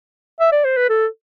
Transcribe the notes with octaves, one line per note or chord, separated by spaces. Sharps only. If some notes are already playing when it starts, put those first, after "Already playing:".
E5
D5
C5
B4
A4